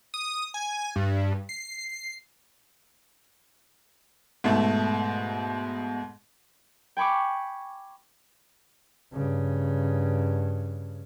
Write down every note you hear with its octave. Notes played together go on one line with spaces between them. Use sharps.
D#6
G#5
G2
C7
G#2 B2 A3
G5 G#5 B5 C#6 D6
G2 C#3